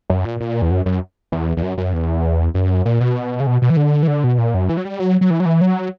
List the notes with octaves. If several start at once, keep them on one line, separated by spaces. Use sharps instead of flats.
F#2
A#2
A#2
E2
F#2
F#2
E2
E2
F#2
F#2
E2
F#2
A#2
B2
C#3
B2
B2
E3
D3
E3
D3
B2
A#2
F#2
E3
F#3
G3
F#3
F#3
E3
F#3
E3
F#3